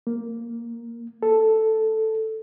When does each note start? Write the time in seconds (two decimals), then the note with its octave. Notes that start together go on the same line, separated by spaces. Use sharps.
0.07 A#3
1.23 A4